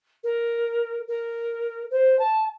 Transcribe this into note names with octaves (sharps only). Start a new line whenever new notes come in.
A#4
A#4
C5
A5